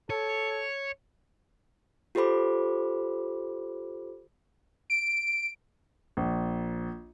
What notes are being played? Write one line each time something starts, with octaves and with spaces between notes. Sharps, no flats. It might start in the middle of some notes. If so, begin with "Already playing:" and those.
A4 C#5
F4 G4 A4 C5 B5 D6
D7
A#1